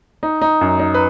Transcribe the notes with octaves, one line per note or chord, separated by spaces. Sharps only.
D#4
D#4
F#2
D#4
B4